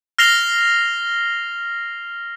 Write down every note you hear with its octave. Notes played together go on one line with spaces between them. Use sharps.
F6 A#6 C7 F7 G7